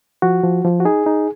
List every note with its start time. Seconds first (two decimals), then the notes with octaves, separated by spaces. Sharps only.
0.22 F3 F#4
0.44 F3
0.65 F3
0.80 F#4
0.85 D#4 G#4
1.06 D#4